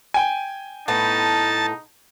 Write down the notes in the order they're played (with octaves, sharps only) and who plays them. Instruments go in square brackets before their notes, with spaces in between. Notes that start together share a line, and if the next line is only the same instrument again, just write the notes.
[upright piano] G5 G#5
[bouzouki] A2 B3 [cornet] D#4 [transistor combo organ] A5